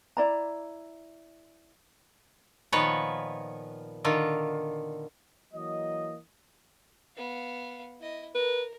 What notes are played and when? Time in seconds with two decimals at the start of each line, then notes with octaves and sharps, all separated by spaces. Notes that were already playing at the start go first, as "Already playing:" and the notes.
0.17 E4 D5 A#5
2.72 A#2 D#3 F3 B3 B4 C#5
4.04 D3 D#3 F4
5.54 E3 F#3 A#3 D#5
7.16 B3 F5
8.00 E4 D#5
8.35 A#4 B4